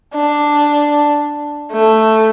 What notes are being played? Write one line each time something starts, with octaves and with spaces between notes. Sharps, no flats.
D4
A3